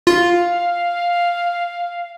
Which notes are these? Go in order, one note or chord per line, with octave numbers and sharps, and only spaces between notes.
F4 F5